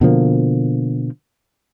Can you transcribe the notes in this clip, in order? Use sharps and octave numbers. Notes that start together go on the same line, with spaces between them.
B2 D3 F3 A#3